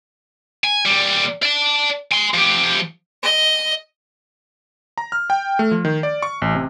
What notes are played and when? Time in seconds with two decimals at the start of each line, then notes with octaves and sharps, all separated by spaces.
0.64 G#5
0.85 A#2 G3
1.42 D5 A5
2.12 G#5 C6
2.34 F3 G4
3.23 D#5
4.98 A#5
5.12 F6
5.30 G5
5.59 A3
5.71 F3
5.85 D#3
6.03 D5
6.22 C#6
6.42 A1
6.55 C3